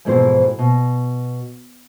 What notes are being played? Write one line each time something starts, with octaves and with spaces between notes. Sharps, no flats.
F2 G#2 B2 E3 C4 C5
B2